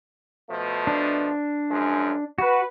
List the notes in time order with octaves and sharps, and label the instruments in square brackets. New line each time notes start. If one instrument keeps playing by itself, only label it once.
[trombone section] B2 F3 A3
[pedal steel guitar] D4
[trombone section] F#2 F3 G#3
[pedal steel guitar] F#4 [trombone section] B4